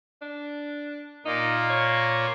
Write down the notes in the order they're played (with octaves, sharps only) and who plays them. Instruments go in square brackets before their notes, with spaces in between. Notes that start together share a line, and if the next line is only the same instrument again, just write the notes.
[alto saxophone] D4
[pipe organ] A#2 A#3 [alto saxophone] D#4
[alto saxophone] C#5